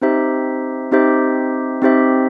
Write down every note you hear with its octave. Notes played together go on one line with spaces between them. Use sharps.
C4 D#4 G4 C5 E5
C4 D#4 G4 C5 E5
C4 D#4 G4 C5 E5